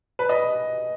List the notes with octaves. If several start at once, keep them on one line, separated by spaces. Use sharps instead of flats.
B4
D#5